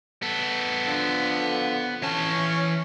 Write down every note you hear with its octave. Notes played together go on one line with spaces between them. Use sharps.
B3 A4
D3 F3
E3 C#4 A5